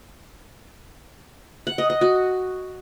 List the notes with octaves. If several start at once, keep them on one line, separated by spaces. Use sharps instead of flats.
F#5
D#5
D#5
F#4